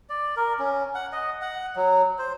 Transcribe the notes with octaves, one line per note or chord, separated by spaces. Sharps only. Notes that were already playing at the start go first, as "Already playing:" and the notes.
D5
A#4
C#4
F#5
D#5
F#5
F#3
C5